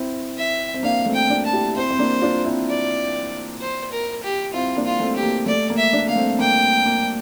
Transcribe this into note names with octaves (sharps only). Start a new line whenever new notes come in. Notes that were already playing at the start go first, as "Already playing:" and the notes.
Already playing: C4 E4
E5
C4
A#3 D4 F5
A3 C4
G5
A#3 D4
A5
E4 G4
C4 E4 C5
C4
A#3 D4
D4 F4
C4 E4
D5
C5
A#4
G4
C4 E4 F4
A#3 D4
F4
A3 C4
G4
A#3
A3 D5
A#3
E5
A#3 D4
A#3 F5
A3 C4
A#3 G5
A#3